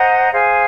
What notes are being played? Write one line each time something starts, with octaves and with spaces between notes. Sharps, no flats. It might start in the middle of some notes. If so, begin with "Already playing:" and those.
Already playing: C5 D#5 F#5 A#5
G#4 C5 F5 G#5